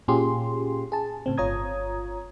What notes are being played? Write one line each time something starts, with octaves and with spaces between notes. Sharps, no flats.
A#2 C#4 F4 G4 G#4 C6
G#4 A5
A2 C#3 C4
G1 F4 C#5 A#5 D#6 G#6